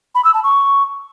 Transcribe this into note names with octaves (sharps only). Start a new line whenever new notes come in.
B5
E6
A5
C#6